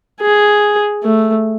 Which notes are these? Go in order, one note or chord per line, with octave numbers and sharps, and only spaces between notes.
G#4
A3